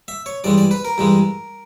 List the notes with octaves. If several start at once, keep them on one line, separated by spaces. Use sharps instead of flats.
E5
C#5
G2 E3 G#3 D5
D5
B4
A#4
G2 E3 G#3